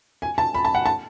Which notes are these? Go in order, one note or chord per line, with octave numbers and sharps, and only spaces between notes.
G#5
A5
B5
A5
F#5
A5